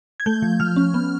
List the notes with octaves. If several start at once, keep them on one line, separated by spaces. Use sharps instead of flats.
G#6
A3 G6
F3
F3 F6
C#4
B3